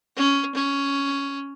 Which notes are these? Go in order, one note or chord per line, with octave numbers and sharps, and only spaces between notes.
C#4
C#4